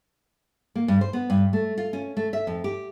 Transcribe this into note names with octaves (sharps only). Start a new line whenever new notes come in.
A#3
G2
C5
B3
G2
A3
F4
C#4
A3
E5
F2
G4